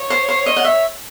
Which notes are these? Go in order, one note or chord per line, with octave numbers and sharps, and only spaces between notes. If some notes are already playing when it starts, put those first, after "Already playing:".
Already playing: C#5
C5
C5
D#5
F#5
E5